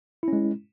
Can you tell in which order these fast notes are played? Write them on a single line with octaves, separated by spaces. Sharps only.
E4 C#4 G#3